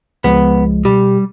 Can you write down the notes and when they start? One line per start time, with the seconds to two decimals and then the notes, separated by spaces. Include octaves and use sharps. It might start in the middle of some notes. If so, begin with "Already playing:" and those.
0.24 C#2 F3 G#3 B3
0.85 B2 G3 G4